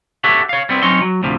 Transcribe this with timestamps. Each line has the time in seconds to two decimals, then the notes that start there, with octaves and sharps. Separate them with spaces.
0.24 G4 A4 C#5 E5 F#5
0.49 C#5 F5
0.69 G3 B3 C4 E4
0.83 F#3 C4 C#4 D#4 C#5 C6
1.01 F#3
1.23 D2 A2 C3 F3